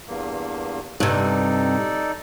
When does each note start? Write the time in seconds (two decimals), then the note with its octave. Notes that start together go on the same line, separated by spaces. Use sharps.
0.08 E2 G2 A#3
1.00 G2 C3 D#4 A4 D5